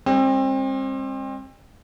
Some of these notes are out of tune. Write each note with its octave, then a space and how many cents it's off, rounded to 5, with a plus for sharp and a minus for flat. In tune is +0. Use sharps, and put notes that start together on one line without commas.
G#3 -45 C4 +30